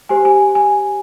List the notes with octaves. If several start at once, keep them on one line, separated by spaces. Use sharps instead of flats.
G4 C5 G#5
G#5
G#5